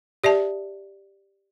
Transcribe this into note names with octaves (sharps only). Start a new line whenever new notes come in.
G4 D5 E5 A5